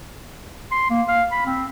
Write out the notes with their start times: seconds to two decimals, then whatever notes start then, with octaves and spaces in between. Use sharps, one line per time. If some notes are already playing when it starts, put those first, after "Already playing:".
0.72 C6
0.90 A#3
1.08 F5
1.32 B5
1.46 C4